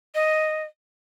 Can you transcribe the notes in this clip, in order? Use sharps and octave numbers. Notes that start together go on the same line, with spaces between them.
D#5